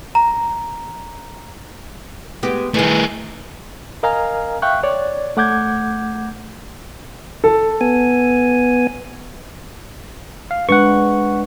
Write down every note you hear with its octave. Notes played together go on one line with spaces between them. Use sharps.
A#5
G#3 B3 G4
D#3 E3 A3 G#4
A#4 D#5 F5 G#5 A#5 F6
E5 F5 G5 C#6 F#6
C#5 D5
A3 F#5 D6 G6 G#6
A4
B3 G#5
F5
G#3 D4 B4 F#5 C#6